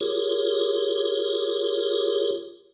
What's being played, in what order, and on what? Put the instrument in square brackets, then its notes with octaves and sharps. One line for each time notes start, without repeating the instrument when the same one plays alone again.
[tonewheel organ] F4 G4 G#4 A#4 C#5